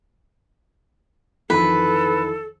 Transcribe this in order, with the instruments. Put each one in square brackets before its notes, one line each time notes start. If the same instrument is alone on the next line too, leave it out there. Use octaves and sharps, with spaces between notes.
[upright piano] F2 D#3 E3 [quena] A4 [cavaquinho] B4